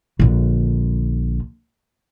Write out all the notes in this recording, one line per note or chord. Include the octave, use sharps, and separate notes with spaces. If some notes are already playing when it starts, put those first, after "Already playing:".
A#1 D3